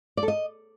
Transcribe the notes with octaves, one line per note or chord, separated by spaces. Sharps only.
D5
A4
D#5